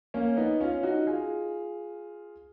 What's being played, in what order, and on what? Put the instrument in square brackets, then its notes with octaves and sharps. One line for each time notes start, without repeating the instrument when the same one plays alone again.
[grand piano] A#3 C#4
B3 D#4
C#4 F4
D#4 F#4
F4 G#4